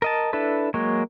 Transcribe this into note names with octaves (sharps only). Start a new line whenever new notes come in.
A#4 D#5 A5
D4 E4 A4 B4
F#3 G#3 A#3 C#5